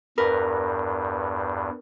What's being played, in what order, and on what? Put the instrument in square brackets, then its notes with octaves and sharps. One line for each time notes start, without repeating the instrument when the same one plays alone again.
[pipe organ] E2 G2 [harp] A#4 B4